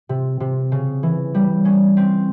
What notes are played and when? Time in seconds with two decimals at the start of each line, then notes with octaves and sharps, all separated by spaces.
0.09 C3
0.40 C3
0.72 C#3
1.03 E3
1.34 G3
1.65 C#4
1.97 C4